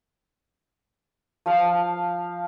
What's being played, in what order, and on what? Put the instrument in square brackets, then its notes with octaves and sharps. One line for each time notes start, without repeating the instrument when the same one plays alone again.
[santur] F3 F5